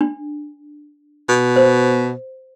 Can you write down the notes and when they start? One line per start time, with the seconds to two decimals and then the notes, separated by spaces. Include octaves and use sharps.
0.01 D4
1.29 B2
1.56 C5